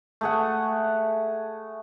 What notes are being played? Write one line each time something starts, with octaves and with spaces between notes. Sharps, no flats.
A3 G#4 F#5